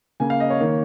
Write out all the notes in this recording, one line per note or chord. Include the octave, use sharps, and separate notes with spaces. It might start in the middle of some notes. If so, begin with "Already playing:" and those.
C#3 A#3 G#5
F5
D#5
C#5
D#3 A#3